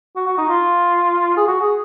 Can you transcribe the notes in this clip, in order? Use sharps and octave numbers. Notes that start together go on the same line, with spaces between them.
F#4
F#4
D#4
F4
G#4
F#4
G#4